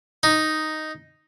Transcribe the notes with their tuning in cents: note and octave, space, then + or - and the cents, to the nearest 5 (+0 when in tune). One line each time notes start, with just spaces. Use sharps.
D#4 +0